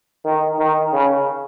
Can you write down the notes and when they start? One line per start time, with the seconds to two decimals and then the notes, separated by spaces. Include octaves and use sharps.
0.24 D#3
0.59 D#3
0.93 C#3